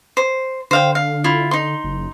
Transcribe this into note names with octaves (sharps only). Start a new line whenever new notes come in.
C5
D3 C5 F5 G5
F5
E4 F4
D#4 C6
F#1